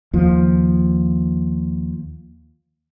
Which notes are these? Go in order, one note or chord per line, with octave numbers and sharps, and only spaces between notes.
D#2 F3